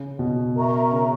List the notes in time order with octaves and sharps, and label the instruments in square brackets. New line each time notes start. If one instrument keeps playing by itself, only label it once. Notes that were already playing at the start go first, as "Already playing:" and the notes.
Already playing: [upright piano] C#3
B2
[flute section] A#4 E5 A#5 C#6
[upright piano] C#3